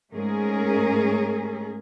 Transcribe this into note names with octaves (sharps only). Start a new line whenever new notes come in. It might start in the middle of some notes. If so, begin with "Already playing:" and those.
G#2 A3 C#4 G#4 A#4